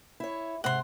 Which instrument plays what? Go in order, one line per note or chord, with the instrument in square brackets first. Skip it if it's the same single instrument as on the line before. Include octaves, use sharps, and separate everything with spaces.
[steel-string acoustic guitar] E4 C#5
[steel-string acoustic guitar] G#2 C3 [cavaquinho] F#5 C6